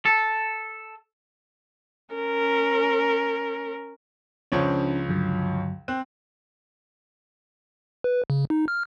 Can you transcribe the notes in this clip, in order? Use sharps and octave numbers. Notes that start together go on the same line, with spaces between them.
A4
C#4 A#4
C#2 F3 C#4 D4 C5 C#5
G2 D3 F#3
C4 F#6
B4
C#3
D#4
F6